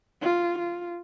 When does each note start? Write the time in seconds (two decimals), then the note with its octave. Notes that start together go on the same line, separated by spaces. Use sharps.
0.22 F4
0.59 F4